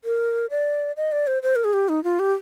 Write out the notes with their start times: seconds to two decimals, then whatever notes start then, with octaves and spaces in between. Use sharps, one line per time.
0.04 A#4
0.50 D5
0.97 D#5
1.12 D5
1.27 C5
1.43 C5
1.56 A#4
1.64 G#4
1.73 G4
1.89 D#4
2.04 F4
2.19 G4